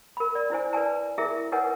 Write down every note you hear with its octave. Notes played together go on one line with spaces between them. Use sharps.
A#4 B5
D5
D4 E4 C5 G#5
B4 D5 G#5 A5
E4 G#4 A#4 E5
D#4 A#4 B4 C#5 F#5 G#5